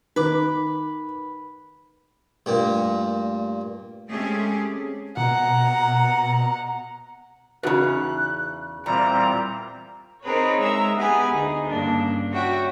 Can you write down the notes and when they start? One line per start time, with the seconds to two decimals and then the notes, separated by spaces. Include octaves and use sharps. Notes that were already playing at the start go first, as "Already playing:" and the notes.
0.16 D#3 B4 D6
2.46 G2 A#2 A3
4.10 G#3 A3 C4 C#4 G4 G#4
5.17 B2 F#5 A#5
7.63 E2 C#3 D#4 F#4 B4 F#6
8.86 E2 A#2 G3 C4 A#5
10.22 C4 D#4 G#4 A#4 B4 C#5
10.62 G#3 E5 A#5 E6
10.96 B3 G4 G#4 B4 G#5
11.33 D2 D#4 G#4
11.67 G2 C#3 A#3 D4
12.33 F#4 C#5 E5 G5